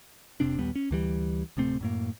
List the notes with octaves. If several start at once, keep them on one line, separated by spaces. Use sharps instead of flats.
F1 C3 C4 D4
A#1 D#2 G3 B3
C#4
D2 E3 G3
D1 C3 A3 C4
F#2 A2 A#3